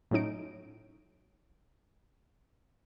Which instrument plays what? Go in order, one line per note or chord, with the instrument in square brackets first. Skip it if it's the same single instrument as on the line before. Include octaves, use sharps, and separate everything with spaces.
[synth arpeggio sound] A2 F#3 C#4 D#4 D7